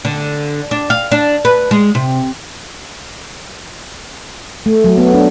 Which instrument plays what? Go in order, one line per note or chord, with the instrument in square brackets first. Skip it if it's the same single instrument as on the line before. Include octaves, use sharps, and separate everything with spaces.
[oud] D3
D4
F5
D4
B4
G#3
C3
[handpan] A3
F#3
B3
D4